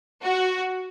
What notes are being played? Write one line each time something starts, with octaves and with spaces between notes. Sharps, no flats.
F#4